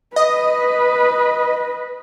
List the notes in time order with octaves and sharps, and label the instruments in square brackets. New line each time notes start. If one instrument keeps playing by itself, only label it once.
[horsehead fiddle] B4 [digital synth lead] D#5